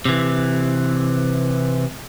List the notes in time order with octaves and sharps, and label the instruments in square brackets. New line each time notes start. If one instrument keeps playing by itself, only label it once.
[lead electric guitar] C3 E3